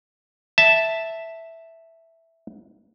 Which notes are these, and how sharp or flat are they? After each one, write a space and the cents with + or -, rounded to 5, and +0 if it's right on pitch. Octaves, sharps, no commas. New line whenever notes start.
E5 +0 A5 +0